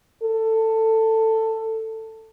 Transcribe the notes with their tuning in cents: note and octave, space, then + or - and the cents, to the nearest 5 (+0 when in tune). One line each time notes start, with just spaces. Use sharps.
A4 +15